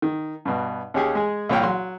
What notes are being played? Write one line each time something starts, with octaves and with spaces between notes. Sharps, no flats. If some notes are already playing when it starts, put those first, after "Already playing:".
D#3
G2 B2
D#2 C#4 G4 G#4
G#3 G#4
C2 A#2 C#5 G5 F6
F#3 C6